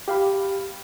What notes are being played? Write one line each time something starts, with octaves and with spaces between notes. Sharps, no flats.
G4 F5 B5